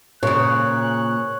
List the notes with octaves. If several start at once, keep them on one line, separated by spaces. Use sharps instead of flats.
A#2 C#3 C#5 F#6